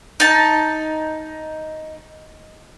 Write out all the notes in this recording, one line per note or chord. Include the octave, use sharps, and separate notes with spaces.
D#4 A5